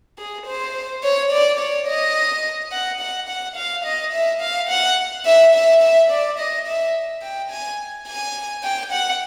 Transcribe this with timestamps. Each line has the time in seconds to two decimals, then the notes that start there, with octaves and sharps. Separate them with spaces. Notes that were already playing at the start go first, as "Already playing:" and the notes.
0.19 G#4
0.46 C5
1.03 C#5
1.32 D5
1.59 C#5
1.88 D#5
2.72 F#5
3.00 F#5
3.28 F#5
3.56 F5
3.85 D#5
4.13 E5
4.41 F5
4.69 F#5
5.25 E5
5.54 E5
5.82 E5
6.11 D5
6.39 D#5
6.67 E5
7.22 G5
7.50 G#5
8.07 G#5
8.64 G5
8.92 F#5